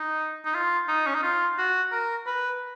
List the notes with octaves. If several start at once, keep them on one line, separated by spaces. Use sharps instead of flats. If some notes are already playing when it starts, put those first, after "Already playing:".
Already playing: D#4
D#4
F4
D#4
C#4
D#4
F4
F#4
A#4
B4